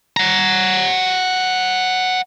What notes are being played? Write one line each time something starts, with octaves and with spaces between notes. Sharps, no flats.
F#5 A#5